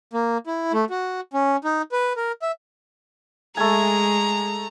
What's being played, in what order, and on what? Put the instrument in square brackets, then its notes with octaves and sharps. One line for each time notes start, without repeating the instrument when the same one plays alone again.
[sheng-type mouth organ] A#3
E4
A3
F#4
C#4
D#4
B4
A#4
E5
[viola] G#3 [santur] A3 G#5 [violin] A#5